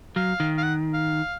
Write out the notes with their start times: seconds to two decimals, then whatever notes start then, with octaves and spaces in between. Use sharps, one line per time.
0.16 F#3 F5
0.40 D#3
0.58 F5
0.63 F#5
0.93 F5